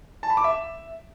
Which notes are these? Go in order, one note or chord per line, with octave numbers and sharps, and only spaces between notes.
A5
B5
D6
E5